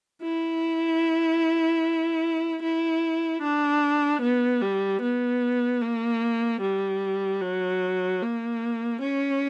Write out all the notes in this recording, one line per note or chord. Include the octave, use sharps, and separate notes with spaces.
E4
E4
D4
B3
G3
B3
A#3
G3
F#3
A#3
C#4